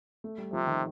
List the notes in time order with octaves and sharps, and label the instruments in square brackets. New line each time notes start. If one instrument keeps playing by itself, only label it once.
[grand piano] A3
G3
[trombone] C3 [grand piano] F3
[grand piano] D#3